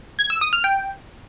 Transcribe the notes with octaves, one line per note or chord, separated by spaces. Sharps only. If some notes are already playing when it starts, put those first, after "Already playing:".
G#6
E6
D#6
F6
G5